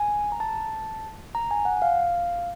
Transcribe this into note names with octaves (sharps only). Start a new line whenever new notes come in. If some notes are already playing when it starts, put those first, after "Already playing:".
Already playing: G#5
A#5
A5
A#5
G#5
F#5
F5